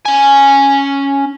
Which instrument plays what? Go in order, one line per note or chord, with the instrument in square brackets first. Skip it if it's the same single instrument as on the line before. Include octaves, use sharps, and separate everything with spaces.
[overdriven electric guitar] C#4 G#5